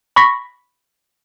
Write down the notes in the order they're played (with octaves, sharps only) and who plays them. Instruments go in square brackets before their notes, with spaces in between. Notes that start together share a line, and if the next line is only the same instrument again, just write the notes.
[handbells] B5 C#6 A#6 B6